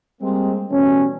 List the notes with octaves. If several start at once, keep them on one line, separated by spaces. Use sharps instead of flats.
G3 G#3 A#3 C4
B2 E3 G3 A3 C#4